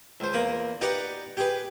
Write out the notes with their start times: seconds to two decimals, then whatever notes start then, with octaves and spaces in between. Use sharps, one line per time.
0.20 C#2 C5
0.33 E2 A#3 B5 D#6
0.81 D#4 G4 B4 D5 F#5 A#5
1.37 G4 G#4 B4